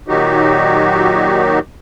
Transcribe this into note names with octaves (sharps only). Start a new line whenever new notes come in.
A#2 D#3 F#3 D#4 F#4 G4